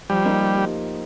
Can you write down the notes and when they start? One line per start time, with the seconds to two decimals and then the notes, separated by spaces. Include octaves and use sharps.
0.10 F3 G3
0.25 A#3 D#4 G4